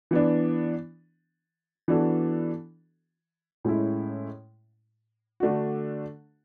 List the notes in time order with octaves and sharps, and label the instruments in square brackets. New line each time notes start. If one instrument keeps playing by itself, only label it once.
[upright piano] E3 B3 D4
E3 B3 D4 F#4 A4
A2 G#3 C#4 E4
D3 A3 D4 F#4